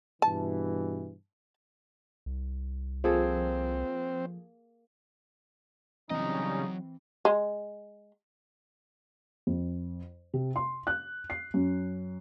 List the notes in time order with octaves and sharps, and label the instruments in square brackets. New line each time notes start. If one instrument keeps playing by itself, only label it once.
[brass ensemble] G2 B2 E3 [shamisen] A5
[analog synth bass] C2
[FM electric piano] F3 [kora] A#3 G#4 A4 [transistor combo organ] C4
[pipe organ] C#3 G3 C#4 [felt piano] E3 C4 [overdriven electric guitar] F#3 D#5 [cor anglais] D#4
[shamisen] G#3
[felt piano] F2
C3
C6
F#6
C7
F#2